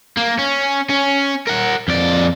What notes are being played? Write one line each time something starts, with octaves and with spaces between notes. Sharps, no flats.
A#3
C#4
C#4
A#4 F#5
F2 D5